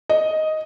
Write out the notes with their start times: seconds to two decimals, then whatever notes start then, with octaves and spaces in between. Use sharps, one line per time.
0.09 D#5